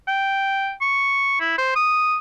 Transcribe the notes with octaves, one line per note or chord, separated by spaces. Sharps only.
G5
C#6
E4
C5
D#6